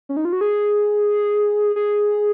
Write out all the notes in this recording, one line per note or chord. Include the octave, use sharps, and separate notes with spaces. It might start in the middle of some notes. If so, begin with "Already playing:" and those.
C#4
D#4
F4
F#4
G#4
G#4